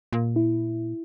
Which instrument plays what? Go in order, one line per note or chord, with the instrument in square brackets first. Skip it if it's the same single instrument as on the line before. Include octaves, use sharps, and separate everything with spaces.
[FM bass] A#2
[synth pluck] E4